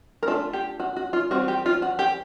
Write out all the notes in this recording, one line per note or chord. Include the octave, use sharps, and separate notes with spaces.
A#4
A3 D4 F4 A4
G4
F#4
F#4
F4
E3 G3 C4 F4 F#4
G4
F4
F#4
G4